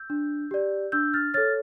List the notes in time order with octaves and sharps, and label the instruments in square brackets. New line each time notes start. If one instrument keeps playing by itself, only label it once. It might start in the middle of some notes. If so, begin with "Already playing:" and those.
Already playing: [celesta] E6 G6
D4
G4 D5
D4 E6 G6
F6 A6
A4 C#5 F6 A6